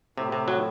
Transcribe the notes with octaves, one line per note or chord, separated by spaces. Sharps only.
A2 C3
C3
F#3